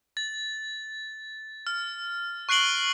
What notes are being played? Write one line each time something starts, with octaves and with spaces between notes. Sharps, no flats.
A6
F6
C#6 F#6 C7 D7 F#7 G7